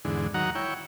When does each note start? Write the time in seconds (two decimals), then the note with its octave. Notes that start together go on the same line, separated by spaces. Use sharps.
0.05 E2 G#2 D3
0.34 D#3 F#3 F#5 A#5
0.55 E4 C#5 G5